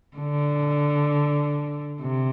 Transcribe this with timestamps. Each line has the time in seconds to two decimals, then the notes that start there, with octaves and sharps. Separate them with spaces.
0.17 D3
2.01 C3